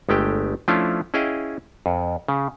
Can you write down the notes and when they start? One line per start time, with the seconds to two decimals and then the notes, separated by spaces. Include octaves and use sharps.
0.09 G1 G#3 A3 G4 G5
0.68 F3 A3 C#4 D4 E4 F4
1.14 C#4 E4 G#4 D#5 F5 G5
1.86 F2
2.28 C#3